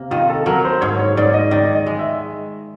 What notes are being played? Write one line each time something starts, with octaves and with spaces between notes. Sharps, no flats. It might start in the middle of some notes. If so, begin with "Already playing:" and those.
Already playing: C3 A#3
D#3 F4
A4
F#3 A#4
C5
G#2 C#5
C#5
G#2 D5
D#5
D#3 D5
D#5
G#3
E5